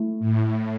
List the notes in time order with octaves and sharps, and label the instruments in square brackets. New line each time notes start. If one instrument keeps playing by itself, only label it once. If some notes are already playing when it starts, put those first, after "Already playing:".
Already playing: [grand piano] A3 E4
[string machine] A2